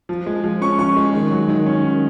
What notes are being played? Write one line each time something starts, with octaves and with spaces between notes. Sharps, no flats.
F3
G#3
F3
C#4 C#6
F3 C#6
G#3
D#3
F#3
D#3
C#4
D#3